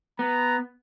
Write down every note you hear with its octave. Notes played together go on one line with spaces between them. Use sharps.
B3 A#5